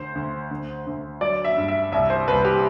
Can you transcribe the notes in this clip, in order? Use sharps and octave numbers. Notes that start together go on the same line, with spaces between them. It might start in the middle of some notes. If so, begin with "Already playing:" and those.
Already playing: D2 C5
D2
D2
D2
F#3 D5
E5
G2
E5
C2 E5
C5
C2 B4
G4